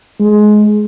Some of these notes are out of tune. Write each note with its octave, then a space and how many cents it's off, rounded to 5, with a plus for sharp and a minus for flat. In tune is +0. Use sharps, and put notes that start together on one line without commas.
G#3 +15